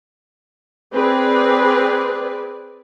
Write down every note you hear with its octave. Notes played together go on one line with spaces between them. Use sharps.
C4 G#4 B4 D5